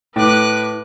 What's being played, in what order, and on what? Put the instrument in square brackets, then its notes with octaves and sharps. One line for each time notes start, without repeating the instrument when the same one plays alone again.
[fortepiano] A2 [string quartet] B4 D6 F#6